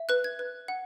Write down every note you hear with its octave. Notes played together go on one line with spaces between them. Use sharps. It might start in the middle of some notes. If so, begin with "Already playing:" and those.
Already playing: E5
B4 F#6
G#6
B4
F#5